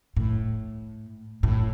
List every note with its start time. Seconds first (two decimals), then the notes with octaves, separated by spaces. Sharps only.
0.17 A2
1.43 A2